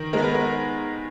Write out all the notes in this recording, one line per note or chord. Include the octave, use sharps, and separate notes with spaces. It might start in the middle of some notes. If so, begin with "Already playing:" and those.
Already playing: D#3 A#4
G#3 B3 A#4
B4
A#4